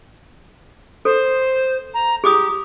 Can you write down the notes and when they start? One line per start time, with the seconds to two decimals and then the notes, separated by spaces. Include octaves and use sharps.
1.05 A4 C5
1.94 A#5
2.24 G4 G#4 D6 D#6